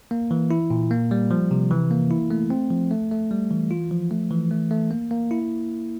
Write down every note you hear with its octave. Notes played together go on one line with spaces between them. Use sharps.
A#3
E3
E4
A#2
A#3
G3
F3
C3
E3
A#3
E4
A3
C4
F3
A3
A3
G3
E3
F4
F3
A3
E3
A3
A3
A#3
A#3
E4